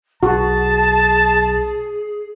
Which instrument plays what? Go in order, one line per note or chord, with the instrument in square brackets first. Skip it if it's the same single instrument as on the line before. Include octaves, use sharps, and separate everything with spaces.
[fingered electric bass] B1 [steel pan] F#4 [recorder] G#4 [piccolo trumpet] A5